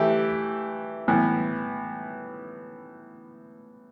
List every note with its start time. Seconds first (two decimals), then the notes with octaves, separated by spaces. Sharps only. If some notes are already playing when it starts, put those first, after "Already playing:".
Already playing: E3 A3 E4 G4
1.08 A2 E3 B3